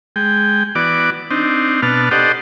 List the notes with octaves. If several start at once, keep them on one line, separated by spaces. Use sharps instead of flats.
G#3 G5
E3 B3 F#4 D5 D6
C4 D4 D#4
B2 B3 D4 A5 F6
G4 A4 C5 D5 D#5 F#5